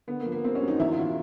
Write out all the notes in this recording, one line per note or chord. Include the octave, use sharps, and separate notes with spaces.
D3 B3
A#3
F3
A#3
G1 C4
C#4
F#2
D#4
E2 E4
F4
B2